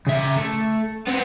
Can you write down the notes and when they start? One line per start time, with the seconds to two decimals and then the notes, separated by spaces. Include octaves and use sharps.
0.07 C#3 E5
0.38 A3
1.07 B3 C4